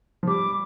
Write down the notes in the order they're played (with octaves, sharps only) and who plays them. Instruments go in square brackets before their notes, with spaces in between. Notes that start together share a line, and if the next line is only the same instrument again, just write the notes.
[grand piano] F3
[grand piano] G3 [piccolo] D6